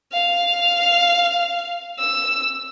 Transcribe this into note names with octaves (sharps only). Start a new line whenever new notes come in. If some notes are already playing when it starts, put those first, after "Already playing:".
F5
E6